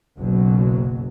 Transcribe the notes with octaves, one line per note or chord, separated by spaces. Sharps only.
F#1 B1 B2 F#3